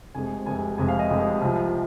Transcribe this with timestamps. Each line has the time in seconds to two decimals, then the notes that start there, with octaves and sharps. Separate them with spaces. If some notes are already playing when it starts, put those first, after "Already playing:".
0.14 F1 F2 C3 G#3 G#5
0.46 F1 F2 C3 G#3 G#5
0.78 F1 F2 C3 G#3 G#5
0.88 F5
0.99 D#5
1.10 F1 F2 C3 G#3
1.42 C2 C3 F3